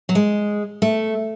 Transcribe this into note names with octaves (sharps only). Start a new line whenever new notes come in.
F#3
G#3
A3